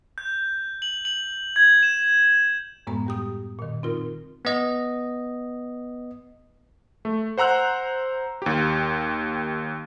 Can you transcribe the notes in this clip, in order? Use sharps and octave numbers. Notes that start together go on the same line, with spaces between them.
G6
F#7
F#7
G#6
E7
F#2 A2 G#3 B3 A#5
G3 G4 D#6
A#2 D#3
C4 D#4 F4 A#4
B3 D#5
A3
C5 F#5 A#5 E6 F#6
D#2 G4